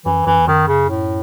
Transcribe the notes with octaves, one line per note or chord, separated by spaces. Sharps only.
F#2 E3
F#2 E3
E2
F#2 D#3
C#3
A2